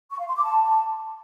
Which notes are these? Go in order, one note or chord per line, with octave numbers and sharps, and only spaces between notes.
C#6
F5
C6
D6
A5